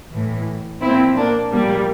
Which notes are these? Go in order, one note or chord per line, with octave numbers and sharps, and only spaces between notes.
A2 E3
A#2 F3 C4 E4
A#3 D4
A#2 F3 G3 A#3